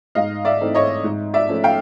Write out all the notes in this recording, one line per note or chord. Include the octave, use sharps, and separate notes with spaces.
G#2 D#5 F5
D5 E5
E3 A3 C4 D#4
C#5 D#5
G#2
D5 E5
F3 A3 C#4
F5 G5